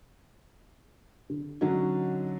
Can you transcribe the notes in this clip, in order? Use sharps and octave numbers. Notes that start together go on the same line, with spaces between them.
D3
D3 F#3 C#4 D#4 F#4